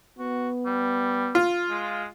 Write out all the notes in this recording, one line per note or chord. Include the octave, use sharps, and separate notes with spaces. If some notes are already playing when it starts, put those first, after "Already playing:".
B3 F#4
G3
F4
G#3